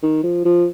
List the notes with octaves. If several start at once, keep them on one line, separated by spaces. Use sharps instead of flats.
D#3
F3
F3